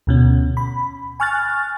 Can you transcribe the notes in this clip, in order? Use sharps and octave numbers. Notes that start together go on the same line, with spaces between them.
D2 B2 C#4
B5
G#5 C#6 F6 F#6 A6